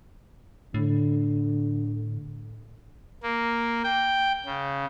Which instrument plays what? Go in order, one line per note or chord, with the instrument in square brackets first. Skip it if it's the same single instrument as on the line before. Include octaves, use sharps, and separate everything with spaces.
[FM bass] A2 [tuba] D3
[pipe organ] A#3
G5
C#3